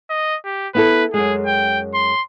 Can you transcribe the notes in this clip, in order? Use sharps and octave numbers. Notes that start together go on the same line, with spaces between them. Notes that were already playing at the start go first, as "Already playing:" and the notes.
D#5
G4
B3 E4 A4 B4
F#2 G#3 G#4
G5
C6